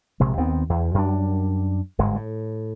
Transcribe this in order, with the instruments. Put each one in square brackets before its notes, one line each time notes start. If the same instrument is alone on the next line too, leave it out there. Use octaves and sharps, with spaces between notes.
[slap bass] A#1 C3 G#3
D#2 D#3 B3 C4
E2
F#2 G3 D4
G1 G#2 G#3
A2